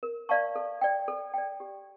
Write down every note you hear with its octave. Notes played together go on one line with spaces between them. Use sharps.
A#4
D5 F5 A5 C#6
A4
D5 G5
A4
D5 G5
G4